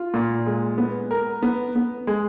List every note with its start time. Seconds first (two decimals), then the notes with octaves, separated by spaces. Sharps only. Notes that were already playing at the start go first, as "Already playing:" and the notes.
Already playing: F4
0.14 A#2
0.46 G#3
0.78 B3
1.11 A#4
1.43 B3
1.76 B3
2.07 G#3